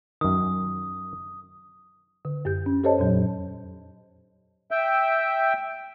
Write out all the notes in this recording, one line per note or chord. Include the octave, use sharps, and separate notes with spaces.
F#2 D#3 D#6
D3
F#2 G4 G6
C#4
G4 A4 C5 C#5 D#5 A5
F2 A#2 F#3
E5 G5